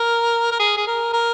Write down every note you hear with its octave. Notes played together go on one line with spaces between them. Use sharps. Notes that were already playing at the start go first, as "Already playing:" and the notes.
Already playing: A#4
A#4
G#4
G#4
A#4
A#4